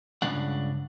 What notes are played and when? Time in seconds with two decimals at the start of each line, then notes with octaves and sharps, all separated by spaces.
0.22 C#2 G2 C#3 D4 F#5